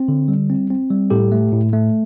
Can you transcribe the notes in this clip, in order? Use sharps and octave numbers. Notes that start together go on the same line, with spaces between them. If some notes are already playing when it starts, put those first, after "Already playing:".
Already playing: C4
D3
G3
C4
C4
G3
A2 G4 A4
A3
A2
A3